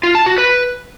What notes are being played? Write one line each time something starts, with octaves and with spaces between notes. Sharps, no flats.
F4
A5
F#4
B4